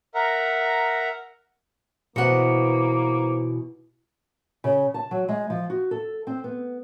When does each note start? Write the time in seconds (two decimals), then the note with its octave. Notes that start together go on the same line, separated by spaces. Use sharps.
0.15 A#4 E5 F#5 A#5
2.16 G#2 B2 E3 A#3 C#4 C5 F#5 C#7
4.64 C#3
4.94 A5
5.11 F#3
5.29 G#3
5.50 F3
5.70 F#4
5.91 A4
6.27 C4
6.44 B3